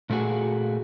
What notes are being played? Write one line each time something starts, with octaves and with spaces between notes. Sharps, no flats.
A#2 A3 A#3 F#4 G#4